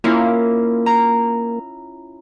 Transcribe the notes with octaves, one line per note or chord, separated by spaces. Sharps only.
A#3 C#4 E4 F4
A#5